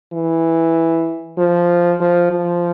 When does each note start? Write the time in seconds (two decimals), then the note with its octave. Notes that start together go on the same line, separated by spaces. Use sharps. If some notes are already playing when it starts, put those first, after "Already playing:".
0.13 E3
1.38 F3
2.00 F3
2.31 F3